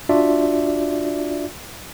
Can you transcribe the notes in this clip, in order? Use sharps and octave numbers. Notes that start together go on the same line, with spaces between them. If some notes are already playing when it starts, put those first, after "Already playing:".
D4 F4 F#4 D5 E5